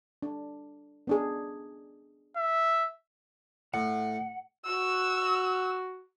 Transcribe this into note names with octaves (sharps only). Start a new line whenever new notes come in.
D4
B3 D4 G#4
E5
A2 F#5
F#4 E6